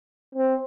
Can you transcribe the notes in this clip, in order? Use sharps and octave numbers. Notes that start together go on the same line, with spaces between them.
C4